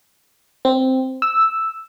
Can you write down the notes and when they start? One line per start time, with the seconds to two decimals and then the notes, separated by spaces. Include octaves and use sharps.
0.65 C4
1.22 E6